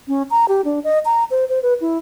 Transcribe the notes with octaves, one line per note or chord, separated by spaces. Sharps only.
C#4
A#5
G4
D4
D#5
A#5
C5
C5
B4
E4